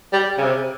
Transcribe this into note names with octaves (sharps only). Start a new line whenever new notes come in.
G3
C#3
C3